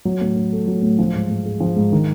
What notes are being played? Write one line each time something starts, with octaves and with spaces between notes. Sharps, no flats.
F#3
A2
A2
A3
F#3
A2
F3
G#2
G#2
G#3
F3
G#2
D#3